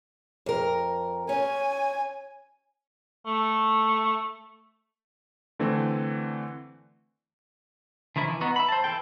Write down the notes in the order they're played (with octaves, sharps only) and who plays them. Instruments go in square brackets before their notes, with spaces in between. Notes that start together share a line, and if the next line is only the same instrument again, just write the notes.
[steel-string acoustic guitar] F2 A#4
[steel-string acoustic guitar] C#4 [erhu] G#5
[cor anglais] A3
[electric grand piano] D3 E3 A3 C4
[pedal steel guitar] D3 D#3 F3 E4
E3
B3 D#4 F#4
E5 B5
C5 A5
E3 E4 A4 G5